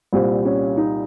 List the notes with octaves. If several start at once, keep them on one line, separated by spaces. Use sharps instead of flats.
C2 A#2 G3 C4
C#4
D#4